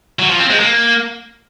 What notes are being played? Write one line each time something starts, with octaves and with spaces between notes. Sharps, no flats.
F#3
F3
C4
G#3
A#3